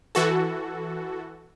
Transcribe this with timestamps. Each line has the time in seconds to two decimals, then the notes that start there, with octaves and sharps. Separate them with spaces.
0.15 E3 F#4 A4